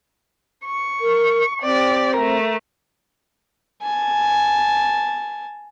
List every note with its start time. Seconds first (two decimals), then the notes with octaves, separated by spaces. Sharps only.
0.67 C#6
1.01 A#4
1.63 C4 G4 D5
2.17 A3 A#4
3.83 G#5 A5